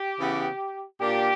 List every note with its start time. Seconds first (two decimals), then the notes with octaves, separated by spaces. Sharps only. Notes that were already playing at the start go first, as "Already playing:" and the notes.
Already playing: G4
0.20 C#3 E3 B3
1.01 A#2 A#3 D4 G4